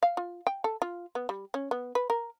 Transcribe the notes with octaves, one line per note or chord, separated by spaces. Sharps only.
F5
F4
G5
A4
F4
B3
G3
C#4
B3
B4
A#4